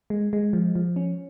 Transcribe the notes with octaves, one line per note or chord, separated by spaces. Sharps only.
G#3
G#3
F3
F3
C#4